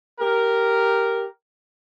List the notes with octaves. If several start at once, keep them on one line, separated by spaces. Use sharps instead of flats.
G4 A#4